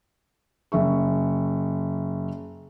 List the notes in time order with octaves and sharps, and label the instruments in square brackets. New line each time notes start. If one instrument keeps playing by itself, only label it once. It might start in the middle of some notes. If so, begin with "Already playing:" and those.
[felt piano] F#1 E5 C#6